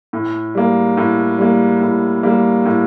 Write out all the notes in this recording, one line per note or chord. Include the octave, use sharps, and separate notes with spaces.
A2
G3 A#3
A2
G3 A#3
A2
G3 A#3
A2